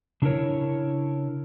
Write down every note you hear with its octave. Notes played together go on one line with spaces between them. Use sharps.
C#3 D4 E4 G#4 A#4 C#5